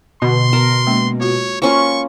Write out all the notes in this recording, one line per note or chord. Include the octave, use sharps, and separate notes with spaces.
B2 D3 C6
A#4 A5
G#3 A#3 C#4
F4 F#4 C#5
A#3 C#4 F4 C5 C#6